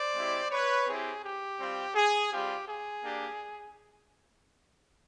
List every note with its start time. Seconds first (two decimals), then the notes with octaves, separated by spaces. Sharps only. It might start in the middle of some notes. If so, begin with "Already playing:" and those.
Already playing: C5 D5
0.15 G#3 C4 E4 G4
0.51 B4 C#5
0.87 C4 E4 G4 G#4
1.23 G4
1.59 G3 C4 F4
1.95 G#4
2.31 G3 C4 F4 G4
2.67 G#4
3.02 A#3 D4 G4